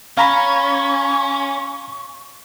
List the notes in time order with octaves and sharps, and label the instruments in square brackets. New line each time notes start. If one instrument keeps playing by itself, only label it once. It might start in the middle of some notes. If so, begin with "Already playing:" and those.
[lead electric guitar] C#4 [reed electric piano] F5 A#5 B5 [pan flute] C#6